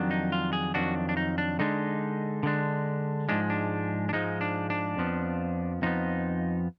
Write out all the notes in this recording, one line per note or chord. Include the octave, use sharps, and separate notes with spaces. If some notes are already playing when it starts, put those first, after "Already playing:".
Already playing: F2 D#3 F#3 D4
D#4
F4
G#4
F2 D#3 F#3 D4 F#4
D4
D#4
D4
D3 G#3 D4 D#4
D3 G#3 D4
G#2 F3 G#3 D4
D4
D4
G#2 F3 G#3 D#4
D4
D4
F2 F3 B3
F2 F3 B3 D#4